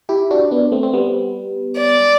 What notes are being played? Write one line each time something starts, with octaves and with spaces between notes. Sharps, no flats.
E4 G4
D4 F#4
B3 D4
A3 C4
C4
G3 B3
D5